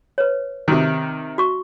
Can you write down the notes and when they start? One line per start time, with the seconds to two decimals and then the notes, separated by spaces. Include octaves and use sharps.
0.18 B4 C#5
0.68 C3 D#3
1.38 F#4 C#6